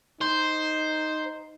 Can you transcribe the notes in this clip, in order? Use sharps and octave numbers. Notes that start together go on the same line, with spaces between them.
D#4 C5